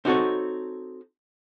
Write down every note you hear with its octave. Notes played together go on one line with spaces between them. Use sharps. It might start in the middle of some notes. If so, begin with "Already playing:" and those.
C4 D#4 F#4 A4 C#5